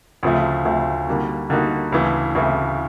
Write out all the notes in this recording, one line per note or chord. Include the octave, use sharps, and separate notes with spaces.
D2 C#3 F3 A3
D2 C#3 F3 A3
D3 G3 A#3 D#4 F#4
D3 G3 A#3 D#4 F#4
D2 C#3 E3 A3
D2 C#3 E3 A3